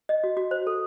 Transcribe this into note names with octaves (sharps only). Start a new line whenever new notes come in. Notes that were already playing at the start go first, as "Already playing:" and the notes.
D#5
F#4
F#4
C5
A4